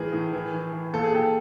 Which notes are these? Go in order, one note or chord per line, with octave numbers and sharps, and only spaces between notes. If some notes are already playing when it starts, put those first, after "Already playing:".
Already playing: A2 E3 G#4 A#4
A2
E3
E3
E3
A#2 A4
G#4
A#2 G4 A4